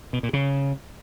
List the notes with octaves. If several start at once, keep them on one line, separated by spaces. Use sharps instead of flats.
B2
A#2
C#3